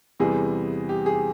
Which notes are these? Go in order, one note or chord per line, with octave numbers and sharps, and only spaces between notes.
E2 C3 E3 G3 G#4
G4
G#4